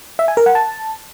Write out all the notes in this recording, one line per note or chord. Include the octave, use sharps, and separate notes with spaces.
E5
G#5
A#4
F#5
A5